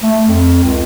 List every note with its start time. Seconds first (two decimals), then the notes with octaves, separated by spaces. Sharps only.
0.03 A3
0.28 F2
0.64 C#2